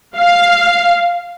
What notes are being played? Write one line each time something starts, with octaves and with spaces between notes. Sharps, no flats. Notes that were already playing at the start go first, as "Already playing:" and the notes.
F5